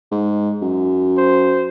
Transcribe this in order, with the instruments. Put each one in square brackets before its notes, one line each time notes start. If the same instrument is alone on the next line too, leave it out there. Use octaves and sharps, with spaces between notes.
[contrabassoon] G#2
F#2
[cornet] C5